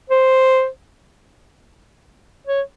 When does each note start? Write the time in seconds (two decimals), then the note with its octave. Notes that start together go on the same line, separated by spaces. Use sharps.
0.10 C5
2.47 C#5